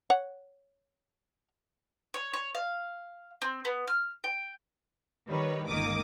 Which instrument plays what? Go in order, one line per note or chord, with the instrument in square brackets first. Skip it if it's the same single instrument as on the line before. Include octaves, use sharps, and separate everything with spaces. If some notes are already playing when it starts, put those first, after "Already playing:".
[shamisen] C#5 F#5
[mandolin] C#5
C#5
F5
C4
B3
F6
G5
[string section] D#3 G3 B4 C#5
G1 C#2 D#3 A#3 D6 D#6